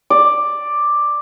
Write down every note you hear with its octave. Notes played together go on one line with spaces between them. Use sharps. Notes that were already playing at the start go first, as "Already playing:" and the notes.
D5